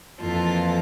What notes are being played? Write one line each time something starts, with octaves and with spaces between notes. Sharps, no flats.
F2 E3 A#3 F4 A4